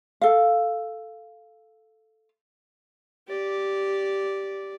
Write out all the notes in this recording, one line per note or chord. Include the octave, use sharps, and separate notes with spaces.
A4 F5
G4 D5